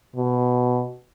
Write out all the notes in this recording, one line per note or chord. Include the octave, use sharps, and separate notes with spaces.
B2